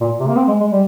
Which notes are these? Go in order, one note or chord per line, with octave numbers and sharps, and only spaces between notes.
A#2
C3
A#3
C4
G#3
G#3
G3